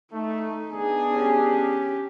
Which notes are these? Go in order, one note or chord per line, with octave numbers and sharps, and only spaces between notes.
A3 D#4
B3 D4 G#4
C#4 G4